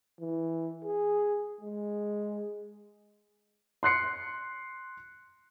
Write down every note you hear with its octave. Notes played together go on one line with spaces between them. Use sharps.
E3
G#4
G#3
C6 F#6 C7 C#7